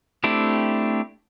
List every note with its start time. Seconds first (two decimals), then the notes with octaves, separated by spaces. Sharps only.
0.24 A3 C4 D4 E4 G4